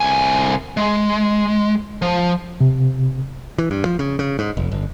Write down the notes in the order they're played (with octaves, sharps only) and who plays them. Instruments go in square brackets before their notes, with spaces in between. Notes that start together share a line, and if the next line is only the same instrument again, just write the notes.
[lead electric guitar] C2 G#5
G#3
F3
[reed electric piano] C3
[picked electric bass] E3
G2
F3
C#3
C#3
G#2
F1
G1